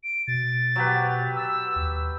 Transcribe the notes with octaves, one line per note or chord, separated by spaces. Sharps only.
D7
B2 A6
F#3 G4 B4
E6
D#2